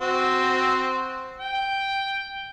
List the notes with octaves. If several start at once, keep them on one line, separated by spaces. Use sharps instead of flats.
C4 F#4
G5